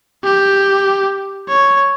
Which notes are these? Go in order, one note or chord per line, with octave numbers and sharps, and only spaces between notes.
G4
C#5